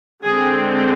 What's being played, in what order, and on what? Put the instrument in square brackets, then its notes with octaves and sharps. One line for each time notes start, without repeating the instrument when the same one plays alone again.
[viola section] D3 G#3 C4 G#4